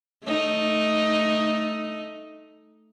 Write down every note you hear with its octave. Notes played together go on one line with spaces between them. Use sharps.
A3 D#4